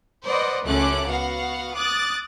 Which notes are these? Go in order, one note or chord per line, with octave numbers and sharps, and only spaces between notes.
B4 C5 D5 D#5 F#5
C#2 F#2 A3 C#4 D6 F#6
B3 F#4 F5 F#5
D6 D#6 F#6 A6